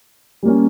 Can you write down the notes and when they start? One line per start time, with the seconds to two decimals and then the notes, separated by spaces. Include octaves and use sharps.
0.43 G3 A#3 C#4